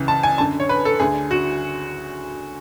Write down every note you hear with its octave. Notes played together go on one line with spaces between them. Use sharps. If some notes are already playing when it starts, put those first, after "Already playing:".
Already playing: C#2 C#3 E3
A5
G#5
F#2 D3 A5
C#5
B4
A4
D2 D3 G#4
F#4